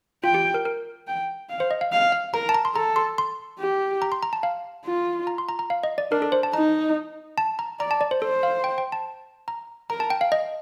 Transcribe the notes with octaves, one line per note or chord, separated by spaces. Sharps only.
F4 G5
G4
A#4
A#4
G5
F5
C5
D#5
F5
F5
F5
A#4 A#5
A5
A#5
C6
A4 A#5
C6
C6
G4
A#5
C6
A#5
A5
F5
F4
A#5
C6
A#5
A#5
F5
D#5
D5
D4 A#4
A4
C5
A5
D#4 A#5
A5
A#5
D5 A#5
A5
D5
C5
A4 C5
F5
G5
G5
A5
A#5
A#4 A#5
A5
G5
F5
D#5